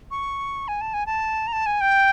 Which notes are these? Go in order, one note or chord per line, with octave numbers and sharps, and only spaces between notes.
C#6
G#5
A5
G#5
A5
A#5
A5
G#5
G5